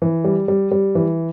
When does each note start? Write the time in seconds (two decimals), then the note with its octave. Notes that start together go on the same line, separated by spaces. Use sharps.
0.02 E3
0.24 G3
0.48 G3
0.71 G3
0.95 E3